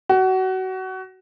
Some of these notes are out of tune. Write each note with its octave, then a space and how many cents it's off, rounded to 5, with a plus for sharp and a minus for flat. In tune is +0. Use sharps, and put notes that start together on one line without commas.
F#4 +25